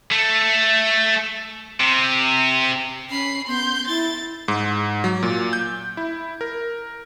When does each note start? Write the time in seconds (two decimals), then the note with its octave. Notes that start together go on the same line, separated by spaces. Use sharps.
0.11 A3
1.80 C3
3.10 C#4 B5 C7
3.47 B3 C6 G6
3.87 E4 A6
4.48 G#2
5.04 F#3
5.23 A#2
5.53 G6
5.97 E4
6.41 A#4